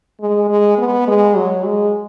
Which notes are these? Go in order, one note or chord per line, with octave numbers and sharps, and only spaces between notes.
G#3
G#3
B3
G#3
F#3
G#3